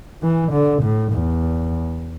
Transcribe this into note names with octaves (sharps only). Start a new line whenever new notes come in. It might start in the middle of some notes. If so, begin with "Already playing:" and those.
E3
D3
A2
E2